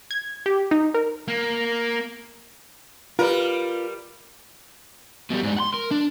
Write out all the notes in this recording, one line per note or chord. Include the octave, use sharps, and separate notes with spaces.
G#6
G4
D#4
A#4
A#3
G3 F4 A#4 B4
B2 G3
G#2 G3
F#5 C6
A#4
D4